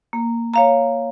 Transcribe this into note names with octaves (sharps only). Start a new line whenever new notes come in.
A#3
C#5 F5 A#5